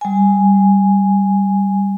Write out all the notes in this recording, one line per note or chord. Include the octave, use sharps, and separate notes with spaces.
G3 G#5